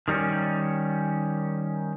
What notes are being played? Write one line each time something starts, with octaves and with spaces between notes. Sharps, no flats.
D#3 G3 A#3 C#4